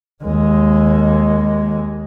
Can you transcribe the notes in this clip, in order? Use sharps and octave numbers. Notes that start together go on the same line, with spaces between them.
D#2 G#3